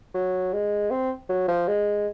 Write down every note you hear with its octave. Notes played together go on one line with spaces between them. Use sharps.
F#3
G#3
C4
F#3
F3
G#3